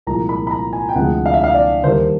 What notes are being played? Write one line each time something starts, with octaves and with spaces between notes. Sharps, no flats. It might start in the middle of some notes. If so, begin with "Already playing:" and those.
C2 A#2 F3 G#3 A#5
B5
B5
A#5
G#5
G5
D2 C3 F3 G#3 F#5
F5
E5
F5
D5
D#2 D#3 G3 C5